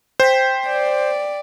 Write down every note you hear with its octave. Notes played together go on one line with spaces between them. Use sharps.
C5 G5 B6
D5